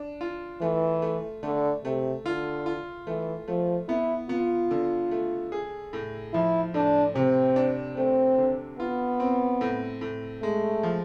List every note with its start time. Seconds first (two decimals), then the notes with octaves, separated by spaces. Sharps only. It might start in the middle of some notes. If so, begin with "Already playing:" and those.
Already playing: D4
0.21 F4
0.61 E3 A3
1.02 A3
1.43 D3 A3
1.84 C3 A3
2.25 D3 F4
2.66 F4
3.07 E3 A3
3.48 F3 A3
3.88 B3 E4
4.29 B3 F4
4.71 D3
5.11 A3
5.52 G#4
5.93 A2
6.33 F3 E4
6.74 A2 D4
7.15 C3 C4
7.56 D4
7.97 A3 C4
8.38 D3
8.79 B3 F4
9.20 C4
9.61 A2
10.01 A2
10.42 G#3 A3
10.83 F3